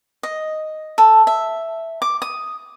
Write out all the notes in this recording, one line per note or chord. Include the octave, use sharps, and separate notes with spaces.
D#5
A4
E5
D6
D#6